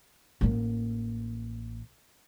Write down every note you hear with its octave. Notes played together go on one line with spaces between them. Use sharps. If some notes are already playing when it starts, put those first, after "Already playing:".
A1 A#3